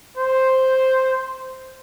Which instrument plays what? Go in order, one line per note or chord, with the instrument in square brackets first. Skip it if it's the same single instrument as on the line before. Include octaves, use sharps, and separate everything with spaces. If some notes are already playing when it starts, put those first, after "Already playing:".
[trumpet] C5